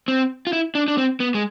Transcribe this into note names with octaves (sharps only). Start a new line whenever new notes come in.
C4
F4
E4
D4
D4
C4
B3
G#3